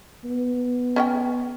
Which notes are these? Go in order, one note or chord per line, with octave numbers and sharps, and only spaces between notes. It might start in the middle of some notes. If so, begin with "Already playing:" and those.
B3
C#4 D#5 G5